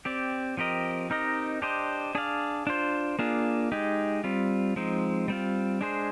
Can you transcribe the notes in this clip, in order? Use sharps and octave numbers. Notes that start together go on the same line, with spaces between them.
C4 G4 D5
F3 C4 G4 A#4 D#5
C4 D#4 G4 A#4 D#5
D4 G4 C5 D#5
D4 G#4 D5 F5
D4 F4 C5
A#3 D4 F4 G#4
G#3 D#4 G4
G3 C4 F4
F3 G#3 C4 D#4
G3 C4 F4
G#3 D4 G#4 C5